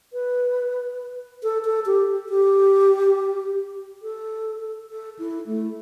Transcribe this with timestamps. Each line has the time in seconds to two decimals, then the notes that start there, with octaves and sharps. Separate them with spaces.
0.13 B4
1.43 A4
1.65 A4
1.86 G4
2.29 G4
4.02 A4
4.90 A4
5.19 E4
5.46 A3